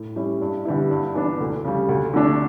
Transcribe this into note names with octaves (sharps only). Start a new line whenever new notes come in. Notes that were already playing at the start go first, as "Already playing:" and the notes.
Already playing: A2
G3 C#4 E4
G2
D3 G3 B3 E4
G2
E3 B3 D4
D2
C#3 G3
D2
D3 A3 D4